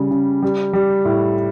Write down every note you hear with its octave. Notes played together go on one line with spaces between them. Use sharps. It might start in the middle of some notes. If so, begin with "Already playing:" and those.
Already playing: C#3 G3
C#3
G3
G3
A2